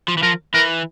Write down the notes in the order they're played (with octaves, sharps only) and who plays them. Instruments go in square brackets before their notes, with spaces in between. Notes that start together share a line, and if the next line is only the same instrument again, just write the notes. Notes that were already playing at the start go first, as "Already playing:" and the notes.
[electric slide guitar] F3
E3
[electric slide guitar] F3 [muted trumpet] A#4
[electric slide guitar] E3 [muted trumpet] A#4